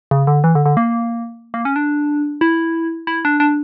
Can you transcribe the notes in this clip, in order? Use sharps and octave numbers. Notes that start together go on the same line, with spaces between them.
C#3
D3
E3
D3
D3
A#3
A#3
C#4
D4
E4
E4
D4
D4